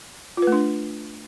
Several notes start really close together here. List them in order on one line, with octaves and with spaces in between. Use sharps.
F4 B4 A3 D4